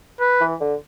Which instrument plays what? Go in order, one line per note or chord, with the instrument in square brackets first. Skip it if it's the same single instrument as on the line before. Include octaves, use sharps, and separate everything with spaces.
[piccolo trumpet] B4
[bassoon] E3
D3